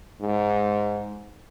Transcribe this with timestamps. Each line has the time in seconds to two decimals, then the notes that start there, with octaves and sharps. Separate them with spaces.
0.21 G#2